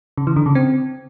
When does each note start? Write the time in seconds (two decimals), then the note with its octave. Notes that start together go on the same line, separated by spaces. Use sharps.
0.18 C#3
0.27 E3
0.36 D3
0.46 C#3
0.55 C4